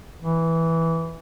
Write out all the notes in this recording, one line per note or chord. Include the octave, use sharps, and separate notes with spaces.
E3